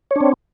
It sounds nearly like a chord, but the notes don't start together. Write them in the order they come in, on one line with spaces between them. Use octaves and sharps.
C#5 D4 C4